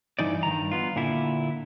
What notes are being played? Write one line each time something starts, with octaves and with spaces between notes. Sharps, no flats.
G2 E3 D#4 D5
G2 D#3 A#5
B3 F4
A#2 D3 E4